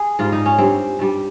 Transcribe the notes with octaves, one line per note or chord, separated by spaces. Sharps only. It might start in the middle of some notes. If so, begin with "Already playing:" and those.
Already playing: G#4
G#2 G3 F4
D#4
C#4
G2 G3 C4
G2 G3